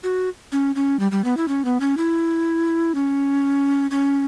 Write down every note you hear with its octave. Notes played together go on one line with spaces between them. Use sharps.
F#4
C#4
C#4
G3
G3
B3
E4
C#4
B3
C#4
E4
C#4
C#4